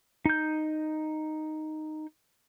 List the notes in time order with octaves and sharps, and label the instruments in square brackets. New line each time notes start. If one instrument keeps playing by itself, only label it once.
[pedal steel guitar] D#4 G6